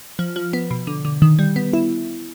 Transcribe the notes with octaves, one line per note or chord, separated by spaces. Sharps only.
F3
F3
B3
B2
D3
D3
D#3
G3
B3
E4